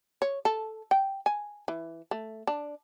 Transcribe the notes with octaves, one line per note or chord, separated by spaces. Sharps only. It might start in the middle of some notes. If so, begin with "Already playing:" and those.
C#5
A4
G5
G#5
E3
A3
D4